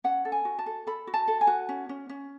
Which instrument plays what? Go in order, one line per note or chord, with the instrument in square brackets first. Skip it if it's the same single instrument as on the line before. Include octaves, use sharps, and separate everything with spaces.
[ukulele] C#4 F#5
A4
G#5
F#4
A5
A4
A4 B5
F#4
A5
A4
G#5
F#4
C#4
C#4
C#4